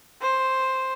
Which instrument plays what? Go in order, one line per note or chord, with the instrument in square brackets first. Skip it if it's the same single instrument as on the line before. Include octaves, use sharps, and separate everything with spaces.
[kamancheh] C5